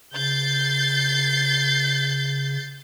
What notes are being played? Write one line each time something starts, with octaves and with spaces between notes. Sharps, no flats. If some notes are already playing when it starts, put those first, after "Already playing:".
C#3 G6 A6 C7